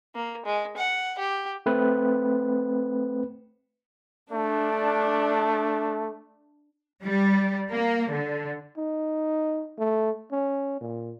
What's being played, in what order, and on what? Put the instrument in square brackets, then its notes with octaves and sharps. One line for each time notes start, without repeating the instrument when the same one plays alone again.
[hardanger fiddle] A#3
G#3
F#5
G4
[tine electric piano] A3 C4 B4
[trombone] A3 [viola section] D4
[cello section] G3
A#3
D3
[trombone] D#4
A3
C#4
A#2